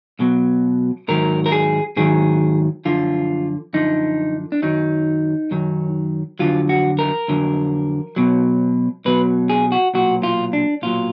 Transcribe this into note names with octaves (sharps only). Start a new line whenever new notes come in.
B1 B2 F#3
G#2 D#3 F#3 A#4
A#4
G#4
G#2 D#3 F#3 G#4
F#2 D3 F3 F4
F#2 D3 F3 D#4
D4
F#2 D#3 F#3 D#4
F#2 D#3 F#3
F2 D3 F#3 F4
F#4
A#4
F2 D3 F#3
B1 B2 F#3
B1 B2 F#3 B4
G#4
F#4
B1 A#2 F#3 F#4
F4
D4
B1 A#2 F#3 F4